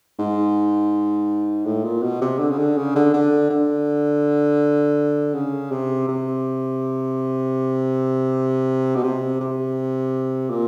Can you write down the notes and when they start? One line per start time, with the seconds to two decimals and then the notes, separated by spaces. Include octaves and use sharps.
0.19 G#2
1.66 A2
1.84 A#2
2.02 B2
2.21 C3
2.39 D3
2.50 C#3
2.59 D3
2.77 C#3
2.96 D3
3.14 D3
3.50 D3
5.34 C#3
5.71 C3
6.08 C3
8.95 B2
9.04 C3
9.40 C3
10.50 A#2